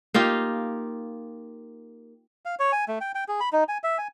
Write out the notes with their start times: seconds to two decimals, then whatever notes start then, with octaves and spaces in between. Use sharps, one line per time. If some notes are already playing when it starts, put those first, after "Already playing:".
0.14 A#3 D#4 F4 G4
2.45 F5
2.59 C#5
2.72 G#5
2.88 A3
3.01 G5
3.15 G5
3.28 G#4
3.40 B5
3.53 D#4
3.68 G#5
3.84 E5
3.98 G#5